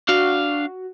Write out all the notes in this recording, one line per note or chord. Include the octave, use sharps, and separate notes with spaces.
D4 F#4 F5